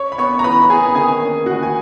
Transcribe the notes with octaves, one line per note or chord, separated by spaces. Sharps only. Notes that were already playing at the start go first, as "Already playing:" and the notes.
Already playing: C#5 C#6
B5
B3 C#5 C#6
A#5
E3 B4 B5
B3 G#4 G#5
D#3 G#4 G#5
A#3 C#4
D#3 F#4 F#5
G#5